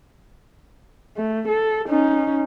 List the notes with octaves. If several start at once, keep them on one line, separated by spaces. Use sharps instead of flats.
A3
A4
C#4 D#4